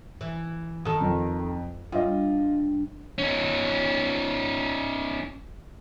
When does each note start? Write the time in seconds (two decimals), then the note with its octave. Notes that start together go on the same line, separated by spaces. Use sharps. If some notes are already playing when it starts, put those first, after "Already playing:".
0.21 E3
0.85 D#3 A4 D#6
1.01 F2
1.92 G2 F4 D#5
3.18 C#4 D#4